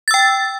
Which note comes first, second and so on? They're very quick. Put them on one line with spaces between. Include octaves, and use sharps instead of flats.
A6 E6 G5